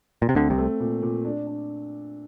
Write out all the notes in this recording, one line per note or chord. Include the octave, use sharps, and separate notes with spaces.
A#2
C3
D2 D3 C4
C2 C3
A3
A#2
A#2
D4
D4